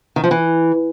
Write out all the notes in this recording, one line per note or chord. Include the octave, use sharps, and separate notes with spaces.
D#3
F3
E3